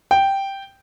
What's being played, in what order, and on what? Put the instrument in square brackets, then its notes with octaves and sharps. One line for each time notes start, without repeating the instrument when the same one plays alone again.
[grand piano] G5